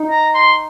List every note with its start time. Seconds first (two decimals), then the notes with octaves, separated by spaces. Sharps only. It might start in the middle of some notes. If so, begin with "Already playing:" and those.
Already playing: D#4
0.11 A#5
0.35 C6